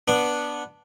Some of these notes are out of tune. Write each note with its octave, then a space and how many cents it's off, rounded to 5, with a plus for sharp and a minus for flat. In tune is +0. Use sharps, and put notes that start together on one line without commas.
B3 -10 D4 +0